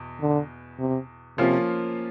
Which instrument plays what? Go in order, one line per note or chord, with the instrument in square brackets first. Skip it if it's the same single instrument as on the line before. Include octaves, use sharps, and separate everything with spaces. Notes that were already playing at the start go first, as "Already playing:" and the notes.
Already playing: [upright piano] E2 B2
[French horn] D3
C3
[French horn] C3 [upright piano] F3 A#3 C#4 F4